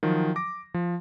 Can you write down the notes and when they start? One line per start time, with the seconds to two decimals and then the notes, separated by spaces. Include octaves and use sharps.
0.03 D#3 F3 F#3
0.36 D6 A#6
0.74 F3